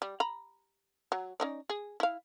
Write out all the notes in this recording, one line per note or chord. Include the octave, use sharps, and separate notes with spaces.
G3
A#5 B5
F#3
C#4 D#4 D5
G#4
E4 F5